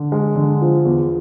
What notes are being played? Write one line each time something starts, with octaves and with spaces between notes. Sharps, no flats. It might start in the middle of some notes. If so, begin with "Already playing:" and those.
Already playing: D3
G#3
D3
F3
E2